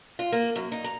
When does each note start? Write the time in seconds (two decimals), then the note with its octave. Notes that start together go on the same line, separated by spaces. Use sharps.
0.19 F4
0.32 A#3
0.56 F#2
0.72 D#4
0.84 A#5